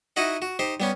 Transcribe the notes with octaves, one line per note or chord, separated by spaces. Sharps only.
D#4 E4 F#4 D#5 F#5
F#4
D#4 G4 C5
G3 B3 C#4